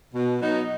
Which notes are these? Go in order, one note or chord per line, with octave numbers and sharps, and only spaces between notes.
B2
F#3 B3 D#4